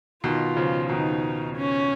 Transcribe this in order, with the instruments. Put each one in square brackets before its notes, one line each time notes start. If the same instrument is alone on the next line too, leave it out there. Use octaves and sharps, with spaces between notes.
[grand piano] B2 D#3 [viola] F4
[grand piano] C#3 F3
[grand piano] B2 D#3 [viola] D#4
[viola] C#4